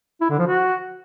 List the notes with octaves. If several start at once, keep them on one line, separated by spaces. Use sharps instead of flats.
E4
D3
F3
F#4